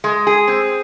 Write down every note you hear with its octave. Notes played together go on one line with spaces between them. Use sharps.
G#3
G#4
C4